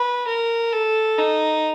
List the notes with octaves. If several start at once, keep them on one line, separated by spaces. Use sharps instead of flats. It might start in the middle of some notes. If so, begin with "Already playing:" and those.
Already playing: B4
A#4
A4
D#4